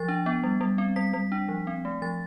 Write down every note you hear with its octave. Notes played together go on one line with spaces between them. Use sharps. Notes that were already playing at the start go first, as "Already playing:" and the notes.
Already playing: F3 A6
D4
B3
G3
G3
C4
G3 B6
G3
D4
F3
C4
A3
F3 A6